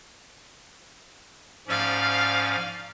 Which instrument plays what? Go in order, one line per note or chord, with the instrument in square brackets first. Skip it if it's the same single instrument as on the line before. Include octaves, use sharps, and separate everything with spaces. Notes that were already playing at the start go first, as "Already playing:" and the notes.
[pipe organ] G#2 F3 C#4 [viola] D5 F5